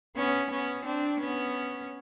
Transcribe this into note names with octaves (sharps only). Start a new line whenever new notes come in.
B3 C#4
B3 C#4
C4 D4
B3 C#4